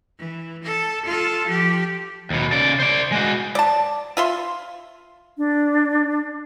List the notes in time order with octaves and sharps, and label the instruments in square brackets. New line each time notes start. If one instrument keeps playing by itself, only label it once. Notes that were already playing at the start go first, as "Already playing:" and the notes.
[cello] E3
A4
F4 A4
F3 G4
[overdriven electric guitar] D#2 B2
C#3 D5
C5 D5
G#3 F#4
[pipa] D5 A5
F4 E5 C6
[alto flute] D4